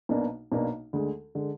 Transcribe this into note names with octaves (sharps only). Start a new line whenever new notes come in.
B1 B2 A#3 D4
B1 B2 A#3 D4
D2 D3 G#3
D3 G#3